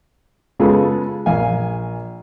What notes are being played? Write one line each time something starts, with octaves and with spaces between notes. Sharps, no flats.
C#3 G#3 B3 F4 G#4 A4
A#1 F5 G#5